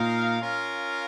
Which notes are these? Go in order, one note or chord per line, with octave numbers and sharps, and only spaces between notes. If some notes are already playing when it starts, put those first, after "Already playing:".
Already playing: A#2 D#4 A#4 F5
C#4 F4 A#4 F5